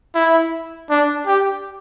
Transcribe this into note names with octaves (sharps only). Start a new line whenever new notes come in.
E4
D4
G4